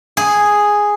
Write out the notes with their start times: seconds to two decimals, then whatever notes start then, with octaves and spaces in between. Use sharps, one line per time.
0.17 G#4